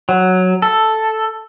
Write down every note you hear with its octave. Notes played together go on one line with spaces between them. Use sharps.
F#3
A4